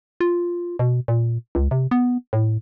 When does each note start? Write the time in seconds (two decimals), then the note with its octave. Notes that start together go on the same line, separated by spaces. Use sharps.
0.21 F4
0.79 B2
1.08 A#2
1.55 C#2
1.71 C3
1.91 B3
2.33 A2